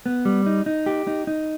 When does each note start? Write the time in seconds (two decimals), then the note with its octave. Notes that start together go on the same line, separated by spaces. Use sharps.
0.06 B3
0.25 G3
0.46 D#4
0.66 D#4
0.86 G4
1.07 D#4
1.27 D#4